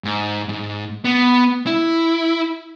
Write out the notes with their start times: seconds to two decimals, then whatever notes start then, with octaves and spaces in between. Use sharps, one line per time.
0.04 G#2
0.49 G#2
1.05 B3
1.67 E4